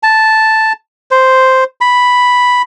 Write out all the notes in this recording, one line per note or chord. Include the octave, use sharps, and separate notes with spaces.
A5
C5
B5